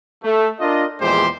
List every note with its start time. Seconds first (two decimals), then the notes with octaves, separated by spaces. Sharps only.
0.24 A3
0.60 D4 F4 A#4 D#5
1.01 E2 A#2 F3 G#3 G4 C5